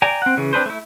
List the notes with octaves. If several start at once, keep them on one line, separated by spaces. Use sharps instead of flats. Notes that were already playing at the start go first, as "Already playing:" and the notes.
D5 G5 G#5 A#5
C4 F#5
C#3 E3
C4 D4 B4 C5
A3 E4